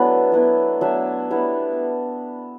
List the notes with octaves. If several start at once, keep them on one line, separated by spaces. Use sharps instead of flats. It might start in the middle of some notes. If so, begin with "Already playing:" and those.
Already playing: F#3 A3 B3 D4 E4 B4
F#3 B3 E4
F#3 A3 D4 E5
G3 B3 E4